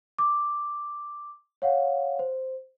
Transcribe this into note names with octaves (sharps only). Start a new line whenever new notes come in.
D6
C#5 F5 F#5
C5